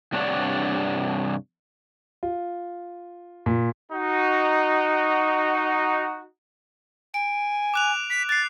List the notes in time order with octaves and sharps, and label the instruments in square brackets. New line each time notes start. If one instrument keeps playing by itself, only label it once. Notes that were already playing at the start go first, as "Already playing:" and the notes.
[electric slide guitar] G2 C3 D4 C#5 D5 F#5
[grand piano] F4
A#2
[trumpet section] D#4 F#4
[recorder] G#5 [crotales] D7
[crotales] D6 F#6 F7
[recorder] B6
[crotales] F#6 C7 [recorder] A6